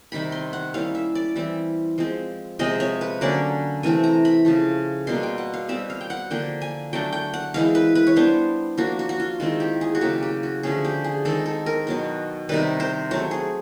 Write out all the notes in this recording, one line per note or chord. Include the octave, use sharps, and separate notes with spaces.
C3 D#3 G3 B5
C6
F#5
G3 A#3 C#4 E4 F5
E5
D5
E3 G3 C4 E4
F3 G#3 C4
C3 F3 G#3 C4 D#5
C#5
B4
D3 F#3 A#3 C#4 D5
C3 E3 A3 C4 G#5
A#5
B5
C#3 F3 A3
B2 G3 A#3 C6
G5
F#5
F5
B2 G3 C4 E5
F5
G5
F#5
D3 F3 A#3 D4 G5
G#5
F#3 A3 D4 G5
G5
F#5
E3 G#3 C4 E4 F5
B4
B4
C#5
G3 B3 D4 C5
F3 A#3 D4 F#4
F#4
F#4
F4
D#3 G#3 C4 E4 F4
G4
G#4
F#4
C#3 F#3 A#3 G4
G4
F#4
D3 F3 A3 C#4 G#4
G4
G#4
D#3 G#3 C4 A4
A4
A#4
B2 F#3 B3
C3 D#3 G3 B4
C5
F#3 A3 C4 C#5
G#4